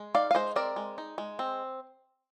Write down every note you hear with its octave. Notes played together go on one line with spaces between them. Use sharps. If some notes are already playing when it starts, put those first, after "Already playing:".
Already playing: G#3
D#4 D5 F5
F5
G#3 C5 D#5
C4 A#4 D5
G#3
D#4
G#3
C4